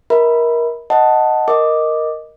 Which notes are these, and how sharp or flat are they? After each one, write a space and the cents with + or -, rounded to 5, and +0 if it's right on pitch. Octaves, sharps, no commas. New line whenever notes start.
A#4 +20 E5 -45 B5 +0
D#5 +0 F#5 +0 A5 +0
A#4 +0 D#5 +0 D6 +0